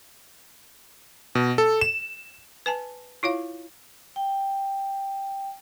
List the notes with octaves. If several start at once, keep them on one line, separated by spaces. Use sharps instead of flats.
B2
A4
E7
B4 G#5 A5
E4 F4 C#5 F5
G5